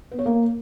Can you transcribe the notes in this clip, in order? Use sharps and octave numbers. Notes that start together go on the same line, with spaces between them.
B3
C#5
A#3